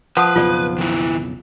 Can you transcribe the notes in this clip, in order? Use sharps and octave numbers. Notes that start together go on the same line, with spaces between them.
F3 B4 F#5 A5 D#6
B1 F2 C#3 F4 D5
D#3 E4